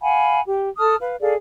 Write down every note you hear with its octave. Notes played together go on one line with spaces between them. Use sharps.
F5 F#5 G#5 B5
G4
A4 A5 D#6 F6
B4 F5
G#4 A4 D5 F5